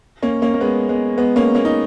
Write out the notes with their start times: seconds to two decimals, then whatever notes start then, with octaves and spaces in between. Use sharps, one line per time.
0.22 A#3 C#4
0.42 A#3 C#4
0.54 A#3
0.61 G#3 B3
0.89 G#3 B3
1.17 G#3 B3
1.36 A#3 C#4
1.55 A#3 C#4
1.65 D#4